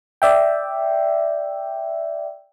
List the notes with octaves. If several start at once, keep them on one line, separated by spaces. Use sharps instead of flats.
D5 E5 G5